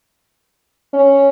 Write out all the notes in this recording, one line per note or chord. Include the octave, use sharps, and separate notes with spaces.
C#4